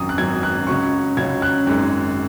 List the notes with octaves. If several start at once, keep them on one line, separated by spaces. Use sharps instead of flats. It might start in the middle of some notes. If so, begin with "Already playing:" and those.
Already playing: G#1 F#2 F#3 D#6
F#6
G#1 F#2 F#3 G#6
F#6
C#2 C#3 F#3 C#4 C#6
C#2 C#3 F#3 C#4 G#6
F#6
G#1 F#2 D#3 G#3